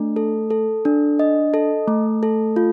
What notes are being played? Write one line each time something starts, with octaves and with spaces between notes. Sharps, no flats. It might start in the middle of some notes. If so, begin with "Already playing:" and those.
Already playing: A3 D4
A4
A4
D4
D#5
A4
A3
A4
F4